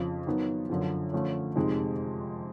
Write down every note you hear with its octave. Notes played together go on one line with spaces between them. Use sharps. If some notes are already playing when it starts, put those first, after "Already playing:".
Already playing: F2 C#3 F3
D#3 F#3 B3
F#2 D3 F3
D3 F3 A3 C#4
F2 C3 D#3 G#3